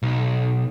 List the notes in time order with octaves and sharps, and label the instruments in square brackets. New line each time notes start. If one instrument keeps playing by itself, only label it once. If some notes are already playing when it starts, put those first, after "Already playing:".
[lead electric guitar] B1